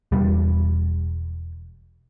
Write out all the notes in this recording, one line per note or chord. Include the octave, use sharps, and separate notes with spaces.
E1 G3